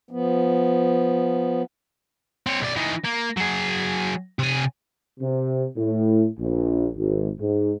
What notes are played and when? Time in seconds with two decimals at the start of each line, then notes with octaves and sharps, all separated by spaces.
0.11 F3 B3
2.47 C4 C#5
2.61 B1 D5
2.77 E3 D#4
3.05 A#3
3.37 F#3 G#4
4.39 C3 G#5
5.20 C3
5.77 A2
6.38 A#1
6.96 G#1
7.39 G#2